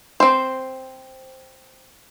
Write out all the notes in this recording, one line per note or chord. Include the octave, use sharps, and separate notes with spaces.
C4 C5